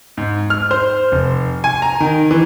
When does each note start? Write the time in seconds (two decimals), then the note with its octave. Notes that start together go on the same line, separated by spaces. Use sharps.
0.17 G#2
0.50 F6
0.71 C5
1.12 F1
1.64 G#5
1.82 A#5
2.00 D#3
2.31 E3